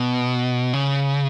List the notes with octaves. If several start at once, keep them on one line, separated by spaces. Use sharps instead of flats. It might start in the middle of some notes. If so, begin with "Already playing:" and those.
Already playing: B2
C#3